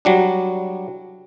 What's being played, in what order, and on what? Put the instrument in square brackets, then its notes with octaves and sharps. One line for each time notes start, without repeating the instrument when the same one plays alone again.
[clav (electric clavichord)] F#3 G3 D4